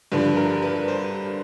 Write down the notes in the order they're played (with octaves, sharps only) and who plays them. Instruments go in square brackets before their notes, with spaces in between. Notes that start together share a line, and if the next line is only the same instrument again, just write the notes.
[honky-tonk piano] G2 D3 F3 B4
A#4
B4
C5